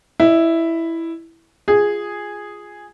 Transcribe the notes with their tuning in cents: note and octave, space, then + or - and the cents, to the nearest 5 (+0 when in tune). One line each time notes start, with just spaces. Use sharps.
E4 +0 D#5 -30
F4 +0 G#4 -5